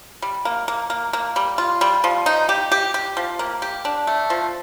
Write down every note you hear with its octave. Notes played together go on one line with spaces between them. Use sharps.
G3
A#3
A#3
A#3
A#3
G3
F4
G3
F3
D#4
G4
G4
G4
F3
A#3
G4
D4
A3
F3